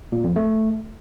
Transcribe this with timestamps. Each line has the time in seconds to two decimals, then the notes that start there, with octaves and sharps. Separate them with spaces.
0.12 A#2
0.24 F2
0.36 A3